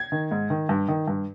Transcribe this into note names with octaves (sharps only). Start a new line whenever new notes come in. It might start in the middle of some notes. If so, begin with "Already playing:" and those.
Already playing: G#6
D#3
G#2
D#3
G2
D#3
G2